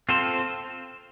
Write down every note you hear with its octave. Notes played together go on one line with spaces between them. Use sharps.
C4 F4 A4 C5